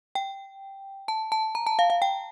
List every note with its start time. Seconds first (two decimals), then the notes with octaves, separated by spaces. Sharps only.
0.15 G5
1.08 A5
1.32 A5
1.55 A#5
1.66 A5
1.79 F5
1.90 F5
2.02 G5